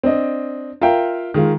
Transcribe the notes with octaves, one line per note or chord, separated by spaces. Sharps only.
C4 D4 D#5
F4 A#4 E5 F5 G5
D#3 G#3 F4